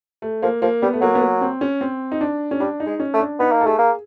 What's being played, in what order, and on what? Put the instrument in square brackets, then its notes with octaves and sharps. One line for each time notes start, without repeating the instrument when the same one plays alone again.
[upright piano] A3
[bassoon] F3 [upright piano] A#3
[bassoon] F3 [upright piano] A#3
[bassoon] G3 [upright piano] B3
[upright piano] A3
[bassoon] F#3 [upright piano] A#3
[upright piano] B3
A#3
C4
C#4
C4
D#4
D4
C#4
[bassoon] G3 [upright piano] D4
[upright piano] D#4
[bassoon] G#3
[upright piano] C#4
[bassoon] A3
[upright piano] D4
[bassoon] B3 [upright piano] D#4
[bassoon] A#3
[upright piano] A4
[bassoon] A3 [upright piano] G#4
[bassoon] A#3